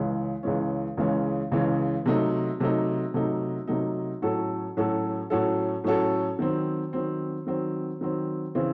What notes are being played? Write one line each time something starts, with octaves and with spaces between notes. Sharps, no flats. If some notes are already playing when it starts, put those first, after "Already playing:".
Already playing: C#2 C#3 E3 G#3 C#4
C#2 C#3 E3 G#3 C#4
C#2 C#3 E3 G#3 C#4
C#2 C#3 E3 G#3 C#4
C3 F#3 A3 D#4
C3 F#3 A3 D#4
C3 F#3 A3 D#4
C3 F#3 A3 D#4
A2 F#3 C#4 F#4 A4
A2 F#3 C#4 F#4 A4
A2 F#3 C#4 F#4 A4
A2 F#3 C#4 F#4 A4
D#3 F#3 C4
D#3 F#3 C4
D#3 F#3 C4
D#3 F#3 C4
C#3 E3 C4